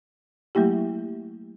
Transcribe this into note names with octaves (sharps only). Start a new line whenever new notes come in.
F#3 A3 A#3 E4 G4